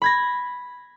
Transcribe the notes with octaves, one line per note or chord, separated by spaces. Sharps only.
B5 G#6 A#6